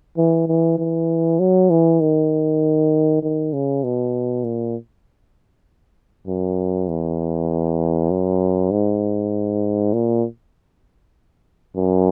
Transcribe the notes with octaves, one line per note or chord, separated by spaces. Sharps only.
E3
E3
E3
F#3
E3
D#3
D#3
C#3
B2
A#2
F#2
E2
F#2
G#2
A#2
F#2